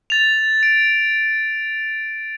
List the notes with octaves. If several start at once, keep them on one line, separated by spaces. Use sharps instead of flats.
A6 F7
D7